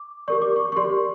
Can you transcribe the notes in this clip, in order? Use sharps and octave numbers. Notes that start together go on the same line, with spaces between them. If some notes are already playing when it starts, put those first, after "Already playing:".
Already playing: D6
G4 A#4 D5 C#6
D6
C#6
C#6
G4 A#4 D5 C6